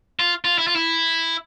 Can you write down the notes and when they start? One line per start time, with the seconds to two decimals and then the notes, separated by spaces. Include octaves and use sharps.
0.19 F4
0.45 F4
0.58 E4
0.67 F4
0.76 E4